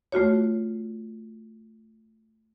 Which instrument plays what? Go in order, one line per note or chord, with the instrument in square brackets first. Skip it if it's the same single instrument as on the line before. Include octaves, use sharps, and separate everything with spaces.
[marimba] A3 F4 F#4 C#5